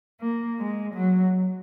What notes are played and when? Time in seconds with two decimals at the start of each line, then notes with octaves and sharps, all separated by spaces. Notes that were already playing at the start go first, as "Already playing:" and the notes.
0.20 A#3
0.58 G#3
0.95 F#3